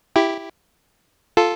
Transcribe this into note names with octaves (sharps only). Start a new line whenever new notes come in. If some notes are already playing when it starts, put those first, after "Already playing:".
E4 G4
F4 A4